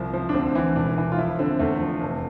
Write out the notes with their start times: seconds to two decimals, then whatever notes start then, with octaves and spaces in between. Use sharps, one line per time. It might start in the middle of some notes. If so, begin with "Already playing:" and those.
Already playing: C2 F3
0.13 F3
0.29 D4
0.34 D2 C4
0.55 E3
0.76 E1 D4
0.98 E3
1.12 F4
1.18 F3 E4
1.39 D3 C4
1.59 E2 A3
1.81 F3
2.01 F1